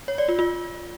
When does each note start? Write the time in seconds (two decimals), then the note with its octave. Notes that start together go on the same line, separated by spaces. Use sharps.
0.08 C#5
0.18 D5
0.28 F4
0.39 F4